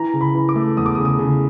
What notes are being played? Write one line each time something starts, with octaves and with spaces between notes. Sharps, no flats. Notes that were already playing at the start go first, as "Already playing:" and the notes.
Already playing: E3 A#5
C#3
B5
E3
D6
A3
E2 D#6
D6
D#6
C#3
D#6
C#3